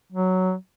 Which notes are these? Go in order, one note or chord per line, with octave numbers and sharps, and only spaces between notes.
F#3